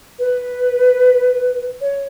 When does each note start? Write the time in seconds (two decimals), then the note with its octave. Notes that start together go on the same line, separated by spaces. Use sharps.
0.18 B4
1.80 C#5